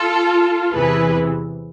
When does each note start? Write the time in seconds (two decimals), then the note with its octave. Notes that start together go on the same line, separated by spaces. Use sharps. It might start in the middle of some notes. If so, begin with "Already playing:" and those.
Already playing: F4 A4
0.74 E2 C3 E3 G#4 B4